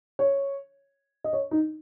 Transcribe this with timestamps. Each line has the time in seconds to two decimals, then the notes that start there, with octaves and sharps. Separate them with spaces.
0.19 C#5
1.24 D#5
1.33 C#5
1.51 D#4